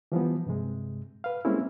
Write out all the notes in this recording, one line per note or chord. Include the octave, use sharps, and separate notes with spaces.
E3 F3 G3 B3
G2 C3 G#3
B4 F5
G3 G#3 A#3 C4 C#4 E4